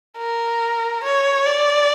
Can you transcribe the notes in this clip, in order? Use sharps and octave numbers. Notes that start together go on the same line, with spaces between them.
A#4
C#5
D5